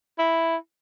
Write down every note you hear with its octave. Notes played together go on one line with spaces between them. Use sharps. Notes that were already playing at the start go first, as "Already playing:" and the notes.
E4